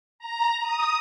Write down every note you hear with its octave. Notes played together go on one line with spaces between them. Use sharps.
A#5
D#6